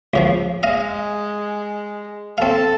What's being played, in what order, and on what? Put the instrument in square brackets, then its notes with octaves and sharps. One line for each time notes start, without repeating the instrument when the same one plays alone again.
[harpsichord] C#2 C#3 F3
[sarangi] G#3 [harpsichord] D#5 F5
[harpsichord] C4 F5 [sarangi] A4